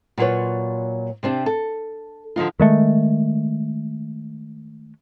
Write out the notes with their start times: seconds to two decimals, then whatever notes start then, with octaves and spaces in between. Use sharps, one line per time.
0.18 A#2 F#3 F4 G4 B4 C#5
1.23 C3 C4 D4 G4
1.46 A4
2.36 D3 F3 D#4 F4
2.60 D#3 G#3 A3